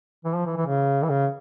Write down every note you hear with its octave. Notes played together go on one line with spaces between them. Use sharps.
E3
F3
E3
E3
C#3
E3
C#3